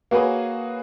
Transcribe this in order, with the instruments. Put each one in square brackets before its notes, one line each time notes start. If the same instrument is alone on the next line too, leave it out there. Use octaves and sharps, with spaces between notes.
[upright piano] A#3 F#4 G#4 B4 C#5